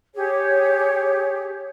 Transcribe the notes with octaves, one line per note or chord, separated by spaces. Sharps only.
G4 G#4 C#5